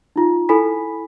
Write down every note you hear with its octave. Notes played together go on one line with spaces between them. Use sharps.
D#4 F4
E4 A4 G#5 B5 B6